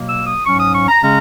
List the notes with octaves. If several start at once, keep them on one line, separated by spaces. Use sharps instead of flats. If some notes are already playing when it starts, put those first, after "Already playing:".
Already playing: B2 F#3 A#3
E6
D#6
G#2 F#3 C#4 C#6
D#6
C#6
A#5
C#3 G#3 C#4 A#5